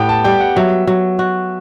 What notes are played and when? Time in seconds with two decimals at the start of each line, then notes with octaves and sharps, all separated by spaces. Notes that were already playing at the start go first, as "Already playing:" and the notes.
Already playing: A2 B3 G4 A4 G5
0.09 A5
0.24 G3 G5
0.40 F#5
0.56 F#3 E5
0.87 F#3
1.19 F#4